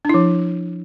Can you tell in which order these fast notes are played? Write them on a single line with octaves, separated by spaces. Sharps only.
D4 E4 F3